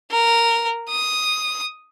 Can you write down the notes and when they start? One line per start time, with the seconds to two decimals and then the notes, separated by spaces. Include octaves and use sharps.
0.11 A#4
0.89 D#6